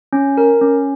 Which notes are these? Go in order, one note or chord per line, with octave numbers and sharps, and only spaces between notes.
C#4
A#4
C#4